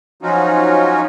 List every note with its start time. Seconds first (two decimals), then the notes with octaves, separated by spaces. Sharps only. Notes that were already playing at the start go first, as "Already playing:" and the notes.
0.22 F3 F#3 C#4 D#4 F4 F#4